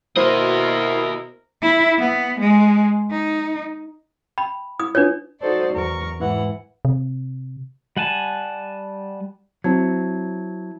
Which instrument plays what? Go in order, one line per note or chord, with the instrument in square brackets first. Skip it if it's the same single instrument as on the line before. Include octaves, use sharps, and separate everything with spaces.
[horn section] B2 A#4 [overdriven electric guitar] A#3 D#5 [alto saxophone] E4 [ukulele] C5
[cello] E4
B3
G#3
D#4
[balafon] G5 [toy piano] B5
[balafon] E4 [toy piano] D#6
[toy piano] D4 C#5 [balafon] E4 F4 B4
[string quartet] D#4 F#4 A4 C5 D5
E2 A#4 C#6
G#2 E3 F#5
[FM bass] C3
[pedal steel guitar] G3 F#5 G#5 A5
[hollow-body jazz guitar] F#3 C4 [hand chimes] E4 A5 G#6